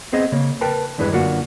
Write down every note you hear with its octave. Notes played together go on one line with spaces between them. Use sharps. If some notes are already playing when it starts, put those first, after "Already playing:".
B3 C4 G#4 D#5
C#3 A#3
A#4 B4 G5 A5
E2 G2 E3 G#3 B4
F#2 D3 A#3 D4 F4 F#4